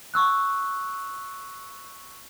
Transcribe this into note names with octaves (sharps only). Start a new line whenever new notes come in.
C#6 E6 F#6